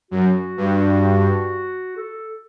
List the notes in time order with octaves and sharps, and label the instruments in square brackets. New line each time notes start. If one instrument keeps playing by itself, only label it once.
[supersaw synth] F#2 [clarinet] F#4
[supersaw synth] G2
[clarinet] A4